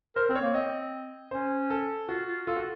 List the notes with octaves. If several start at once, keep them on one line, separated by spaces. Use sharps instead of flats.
A#4 C5
C4 C5
C#5
A#3
C4 D#5
C#4 C5
A4
F4 F#4
F4
F4 A4
F#4